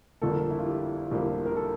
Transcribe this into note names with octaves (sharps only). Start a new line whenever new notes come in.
G1 F2 D3 F3 A#3 A4
A#4
A4
E4
F4
G4
G1 F2 D3 F3 A#3 G4
A#4
A4